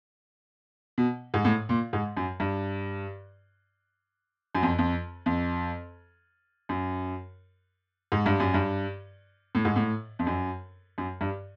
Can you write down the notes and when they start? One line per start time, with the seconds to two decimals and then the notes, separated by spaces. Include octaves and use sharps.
0.98 B2
1.34 G#2
1.45 A2
1.69 A#2
1.93 G#2
2.17 F#2
2.40 G2
4.55 F#2
4.63 F2
4.78 F2
5.26 F2
6.69 F#2
8.12 G#2
8.26 G2
8.40 F#2
8.54 G2
9.55 A2
9.65 G#2
9.76 A2
10.19 F2
10.27 F#2
10.98 F#2
11.21 G2